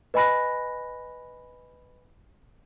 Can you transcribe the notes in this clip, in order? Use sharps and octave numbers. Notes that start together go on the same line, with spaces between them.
B4 D#5 G#5 B5 F#6 A#6